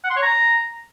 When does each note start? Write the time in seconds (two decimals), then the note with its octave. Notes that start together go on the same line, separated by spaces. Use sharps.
0.04 F#5
0.10 C6
0.16 C#5
0.22 A#5